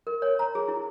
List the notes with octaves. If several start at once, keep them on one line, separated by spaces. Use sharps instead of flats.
A#4
C#5
A#5
G#4
E4